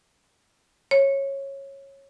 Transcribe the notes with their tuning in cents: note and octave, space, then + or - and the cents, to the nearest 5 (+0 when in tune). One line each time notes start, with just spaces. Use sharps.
C#5 -15